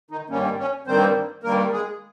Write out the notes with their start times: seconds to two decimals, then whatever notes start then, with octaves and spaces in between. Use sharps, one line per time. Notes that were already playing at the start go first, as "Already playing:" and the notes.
0.11 D#3 D#4
0.29 G2 D#3 G3 A#3 C#4
0.58 C#4
0.87 G2 D#3 G3 A#3 C4 C5
1.43 G2 D#3 G3 A#3 A#4
1.72 G#3 G#4